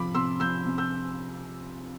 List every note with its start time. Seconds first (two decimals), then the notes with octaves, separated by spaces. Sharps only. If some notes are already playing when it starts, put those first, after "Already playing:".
Already playing: C3 F3 B5 D6
0.15 C3 C6 E6
0.40 F3 E6 G6
0.65 C3
0.78 E6 G6